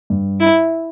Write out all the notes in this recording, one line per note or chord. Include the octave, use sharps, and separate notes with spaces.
G2
E4